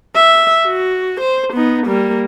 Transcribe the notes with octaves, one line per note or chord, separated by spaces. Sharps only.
E5
F#4
C5
B3 D#4
G3 A#3